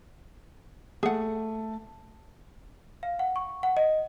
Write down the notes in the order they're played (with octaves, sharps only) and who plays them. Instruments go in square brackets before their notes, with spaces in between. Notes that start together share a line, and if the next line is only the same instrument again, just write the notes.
[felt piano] A3 [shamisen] G#4 F#5
[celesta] F5
F#5
C#6
F#5
D#5